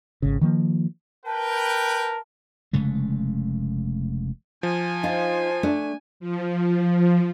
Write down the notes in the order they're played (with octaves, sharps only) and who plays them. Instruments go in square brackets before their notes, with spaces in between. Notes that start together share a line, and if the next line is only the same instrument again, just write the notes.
[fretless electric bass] G#1 C#3
D#3 F3 A#3
[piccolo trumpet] A#4 [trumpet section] B4 G5 [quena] A5
[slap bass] F1 C#3 G#3 A3
[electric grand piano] F3 [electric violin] G#5
[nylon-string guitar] D#4 F4 [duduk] C5
[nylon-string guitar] A3 D4
[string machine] F3